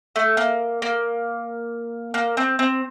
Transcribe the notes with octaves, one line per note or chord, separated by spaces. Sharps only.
A3
A#3
A#3
A#3
C4
C4